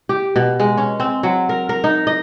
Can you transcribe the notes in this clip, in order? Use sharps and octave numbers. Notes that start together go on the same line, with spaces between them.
G4
B2
G#3
C#4
C4
F#3
A#4
A#4
D#4
D#5